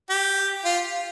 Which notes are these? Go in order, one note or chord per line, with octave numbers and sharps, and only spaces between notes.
G4
F4